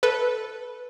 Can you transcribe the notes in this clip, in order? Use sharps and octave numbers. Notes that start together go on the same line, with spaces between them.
A4 B4